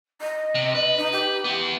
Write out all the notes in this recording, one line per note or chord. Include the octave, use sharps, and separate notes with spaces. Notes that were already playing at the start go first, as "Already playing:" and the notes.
D#5
C3
B4
D#4
G4
B3 E4